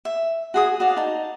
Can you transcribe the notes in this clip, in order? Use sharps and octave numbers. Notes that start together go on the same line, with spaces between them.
E5
F#4 G#4 D#6
F#4 D5 F5
D#4 A5